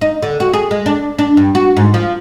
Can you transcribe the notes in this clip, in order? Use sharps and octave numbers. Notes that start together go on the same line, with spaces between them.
D#4
D3
F#4
G#4
G#3
D4
D4
G2
F#4
G#2
F3